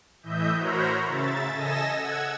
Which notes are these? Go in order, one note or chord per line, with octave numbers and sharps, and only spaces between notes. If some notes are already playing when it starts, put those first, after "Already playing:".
A2 E3 D#5 E5 G6
F#4 A#4 C5 C#5 A#5 B5
C#3 E5 A6
A4 D#5 G#5 E6 A#6 E7
F#5 E6 G#6